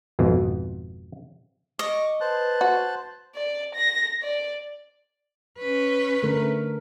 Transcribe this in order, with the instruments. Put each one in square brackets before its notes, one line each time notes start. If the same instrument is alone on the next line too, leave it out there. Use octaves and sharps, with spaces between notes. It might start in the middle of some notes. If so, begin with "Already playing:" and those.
[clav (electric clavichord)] G#1 F2 B2
[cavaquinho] D#5 [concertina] C#6 D6
[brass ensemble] B4 [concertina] C5 A5 F#6
[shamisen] F#4
[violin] D5
A#6
D5
[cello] C#4 B4
[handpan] D3 A3 A#4